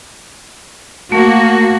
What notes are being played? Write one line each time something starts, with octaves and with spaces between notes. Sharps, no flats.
A3 A#3 F#4